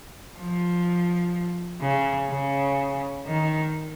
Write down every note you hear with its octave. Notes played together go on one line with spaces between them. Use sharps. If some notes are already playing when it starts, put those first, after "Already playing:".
F3
C#3
C#3
D#3